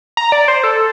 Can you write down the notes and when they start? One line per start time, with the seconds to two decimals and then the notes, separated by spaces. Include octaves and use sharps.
0.17 A#5
0.32 D5
0.48 C5
0.64 A4